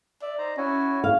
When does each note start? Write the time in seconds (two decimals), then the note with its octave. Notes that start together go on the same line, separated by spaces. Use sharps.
0.22 D5 E5
0.38 D#4 C5 A#5
0.58 C#4 E4 F#4 G#5
1.04 F5